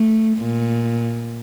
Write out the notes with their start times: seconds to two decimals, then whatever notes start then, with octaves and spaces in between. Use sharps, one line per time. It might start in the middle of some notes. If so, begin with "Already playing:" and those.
Already playing: A3
0.37 A#2